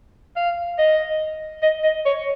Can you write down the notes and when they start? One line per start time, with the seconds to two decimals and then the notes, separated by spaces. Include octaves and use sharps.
0.36 F5
0.78 D#5
1.62 D#5
1.84 D#5
2.06 C#5